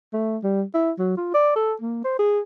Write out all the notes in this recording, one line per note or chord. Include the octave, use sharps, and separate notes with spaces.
A3
G3
E4
F#3
F4
D5
A4
A#3
C5
G#4